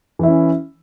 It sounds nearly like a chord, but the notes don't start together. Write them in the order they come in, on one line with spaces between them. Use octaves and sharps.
E3 E4 C#4